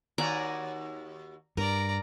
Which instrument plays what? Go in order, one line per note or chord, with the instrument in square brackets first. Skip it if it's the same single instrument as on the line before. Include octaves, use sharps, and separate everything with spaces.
[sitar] D#2 F#4 [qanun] D5 G#5 A#5
[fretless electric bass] G2 [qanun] A#4 [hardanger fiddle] D5 A#5